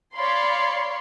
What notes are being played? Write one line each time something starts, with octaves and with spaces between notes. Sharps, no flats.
C#5 D5 F5 B5 C6